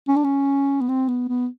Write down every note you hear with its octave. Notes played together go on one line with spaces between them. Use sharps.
C#4
D4
C#4
B3
C4
B3
B3